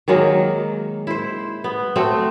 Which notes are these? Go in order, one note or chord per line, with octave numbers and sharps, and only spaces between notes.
D#3 F#3 G#3 A#3
E4 C5
B3
A3 C4 F#4